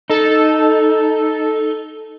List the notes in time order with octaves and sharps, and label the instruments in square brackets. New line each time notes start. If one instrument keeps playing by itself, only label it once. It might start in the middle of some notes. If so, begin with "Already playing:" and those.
[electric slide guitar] D#4 [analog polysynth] A4